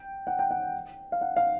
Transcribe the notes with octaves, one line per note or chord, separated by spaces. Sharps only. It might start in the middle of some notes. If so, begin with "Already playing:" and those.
Already playing: G5
F#5
G5
F#5
F5
F#5
F5